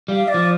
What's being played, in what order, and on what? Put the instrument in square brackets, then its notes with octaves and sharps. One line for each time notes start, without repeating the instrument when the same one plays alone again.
[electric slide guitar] G3 [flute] F5
[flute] D5
[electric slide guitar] F3